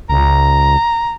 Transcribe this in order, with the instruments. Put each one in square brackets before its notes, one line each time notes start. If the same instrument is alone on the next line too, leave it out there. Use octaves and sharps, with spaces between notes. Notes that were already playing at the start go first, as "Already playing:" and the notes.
[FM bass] C#2 [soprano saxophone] A#5